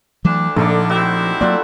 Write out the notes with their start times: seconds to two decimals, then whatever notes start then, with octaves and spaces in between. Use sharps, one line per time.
0.25 D2 E3 F#3 A3 D4
0.56 A#1 D3 F3 A3 D#4 D5
0.89 C4 E4 F#4 G4
1.41 F#3 A#3 F4 A4 D5 F#5